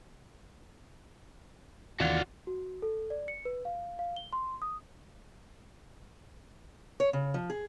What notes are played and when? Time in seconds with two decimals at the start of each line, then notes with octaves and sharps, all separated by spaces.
2.00 D#2 C3 E3 F4 F#4 D5 F5 F#5
2.47 F#4
2.82 A4
3.10 D5
3.28 C#7
3.45 B4
3.65 F5
3.99 F5
4.16 G7
4.33 C6
4.62 D#6
7.00 C#5
7.13 C#3
7.34 F3
7.50 G#4